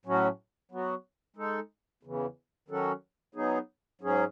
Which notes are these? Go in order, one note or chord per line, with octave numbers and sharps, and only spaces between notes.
A2 F#3 C#4 F#4
F#3 B3 F#4
G#3 D#4 A4
E2 C#3 E3
D#3 F#3 C#4 F#4 A4
F#3 B3 D#4 G#4
G#2 F#3 C#4 G#4